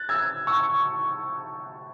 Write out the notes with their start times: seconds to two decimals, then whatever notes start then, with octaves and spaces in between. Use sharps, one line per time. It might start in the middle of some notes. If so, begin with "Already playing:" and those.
Already playing: F#6 A6
0.09 E6 G#6
0.47 C#6 E6